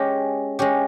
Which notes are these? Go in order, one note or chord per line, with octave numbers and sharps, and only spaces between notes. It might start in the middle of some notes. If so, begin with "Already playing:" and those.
Already playing: G#3 C#4 G4
G#3 C#4 G4